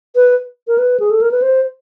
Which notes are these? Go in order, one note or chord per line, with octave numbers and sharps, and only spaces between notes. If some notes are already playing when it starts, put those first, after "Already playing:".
B4
A#4
B4
G#4
A4
A#4
B4
C5